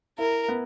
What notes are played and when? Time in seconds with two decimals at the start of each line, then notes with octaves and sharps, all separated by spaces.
0.18 E4 A#4
0.48 B3